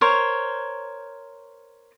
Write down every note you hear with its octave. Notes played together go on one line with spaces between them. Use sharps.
A#4 C5 C#5